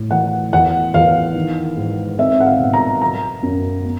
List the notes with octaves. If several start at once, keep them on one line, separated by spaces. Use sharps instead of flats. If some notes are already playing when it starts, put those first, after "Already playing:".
Already playing: A2
E3 F#5
E2 F#5
E2 F5
D#3
G#2
C4 E5
F#5
F5
B2
A#5
F#3 A#5
F#2
B3